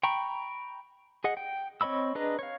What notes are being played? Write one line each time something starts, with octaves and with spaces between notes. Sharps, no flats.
G5 A#5 B5 C#6
G#4 D#5 F#5
G5
C4 C#5 D#5 B5 E6
D4 G#4 B4 D#5 A#5
C#5 F5